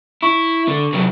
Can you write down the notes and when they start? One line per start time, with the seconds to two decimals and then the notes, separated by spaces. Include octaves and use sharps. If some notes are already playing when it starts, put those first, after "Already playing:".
0.22 E4 C#6
0.68 D3
0.93 C3 F#3